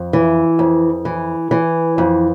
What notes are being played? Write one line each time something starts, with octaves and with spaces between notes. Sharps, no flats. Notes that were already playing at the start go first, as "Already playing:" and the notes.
Already playing: F2
E3
F2
E3
E3
F2